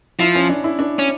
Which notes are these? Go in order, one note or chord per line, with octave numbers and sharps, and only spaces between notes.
F3 E4
C#4
D4
E4
D4
C#4